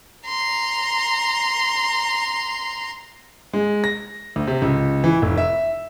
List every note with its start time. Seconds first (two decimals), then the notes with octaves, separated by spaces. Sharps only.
0.27 A#5 C6
3.53 G#3
3.84 A#6
4.36 D2
4.47 C3
4.62 C#2
5.04 E3
5.22 F1
5.38 E5